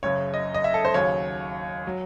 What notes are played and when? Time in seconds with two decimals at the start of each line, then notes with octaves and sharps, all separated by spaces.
0.03 F#1 F#2 C#3 C#5
0.34 D#5
0.54 D#5
0.64 E5
0.74 A4
0.85 C5
0.94 D#2 C#3 F#3 C#5
1.87 F#3